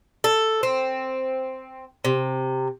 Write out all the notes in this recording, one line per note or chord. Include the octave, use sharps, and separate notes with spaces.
A4
C4
C3